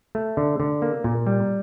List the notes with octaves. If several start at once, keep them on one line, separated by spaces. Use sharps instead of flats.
A3
D3
D3
A#3
A#2
G3